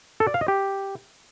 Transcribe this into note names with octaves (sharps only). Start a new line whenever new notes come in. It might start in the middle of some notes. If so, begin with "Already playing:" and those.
A4
D5
F5
D#5
G4